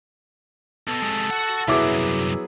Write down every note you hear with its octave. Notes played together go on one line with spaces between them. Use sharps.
B2 A4
C3 G#3
F#4 F#5
C2 F#2 F#3 B3 E4 G#4 D6